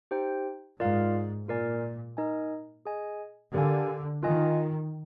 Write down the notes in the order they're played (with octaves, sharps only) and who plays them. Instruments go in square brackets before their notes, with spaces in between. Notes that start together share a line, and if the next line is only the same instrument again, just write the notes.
[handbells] D#4 G4 C5 G5
[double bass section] G#2 [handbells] F4 A#4 D5 F5
[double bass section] A#2 [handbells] F4 A#4 D5 G#5
[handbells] D#4 A#4 D#5 G#5
G#4 D#5 G#5
[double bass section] D3 [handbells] G4 A#4 F5 G#5
[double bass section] D#3 [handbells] F4 A#4 D#5 G#5